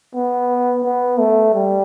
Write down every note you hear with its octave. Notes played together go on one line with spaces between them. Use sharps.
B3
B3
A3
G3